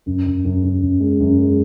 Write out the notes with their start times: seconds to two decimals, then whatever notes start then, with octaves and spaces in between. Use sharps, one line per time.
0.06 F#2
0.26 F#2
0.45 F#2
0.63 F#2
0.82 F#2
1.00 G#3
1.20 F#2
1.39 G#3